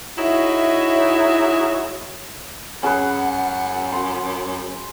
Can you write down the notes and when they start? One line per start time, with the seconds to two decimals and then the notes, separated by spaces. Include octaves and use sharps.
0.17 D#4 E4 F#4 G#4 C#5 E5
2.83 F#2 C#4 G#4 B4 F#5
3.92 C6